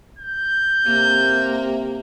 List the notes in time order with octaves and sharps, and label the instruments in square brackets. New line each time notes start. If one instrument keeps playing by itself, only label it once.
[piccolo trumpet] G6
[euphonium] C3 [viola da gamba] A#3